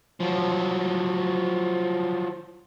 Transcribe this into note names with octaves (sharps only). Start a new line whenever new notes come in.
F3 F#3